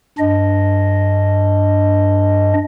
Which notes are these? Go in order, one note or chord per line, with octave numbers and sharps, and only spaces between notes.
G2 D4 D#5